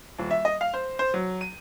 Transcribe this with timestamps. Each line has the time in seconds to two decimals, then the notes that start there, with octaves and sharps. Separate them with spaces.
0.19 D#1
0.31 E5
0.45 D#5
0.61 F5
0.74 C5
0.99 C5
1.14 F#3
1.41 D#7